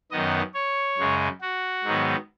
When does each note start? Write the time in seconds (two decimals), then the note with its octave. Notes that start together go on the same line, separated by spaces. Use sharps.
0.11 F#2 D#3 B3 D#5
0.54 C#5
0.98 F#2 C#3 G#3
1.41 F#4
1.84 G#2 D#3 F#3 B3